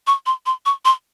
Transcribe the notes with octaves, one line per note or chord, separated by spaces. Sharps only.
C#6
C6
C6
C#6
C6